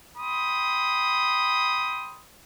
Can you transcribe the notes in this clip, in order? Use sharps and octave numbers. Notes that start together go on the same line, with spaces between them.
G5 B5 C6 D#6